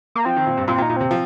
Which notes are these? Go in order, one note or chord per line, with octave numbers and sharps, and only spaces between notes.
A#3
F3 C4
D#3
A#2
G2
A#2 C4
A#2
D#4
A#2
C3 C4
F3